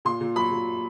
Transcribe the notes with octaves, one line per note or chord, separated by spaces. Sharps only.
A#2 C6
A#2
F#3 B5
A#2